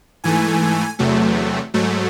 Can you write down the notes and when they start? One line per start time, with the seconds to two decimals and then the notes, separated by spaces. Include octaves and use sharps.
0.24 G#2 E3 A3 G#5
0.99 E2 C3 F#3 A3
1.74 G#2 F#3 A3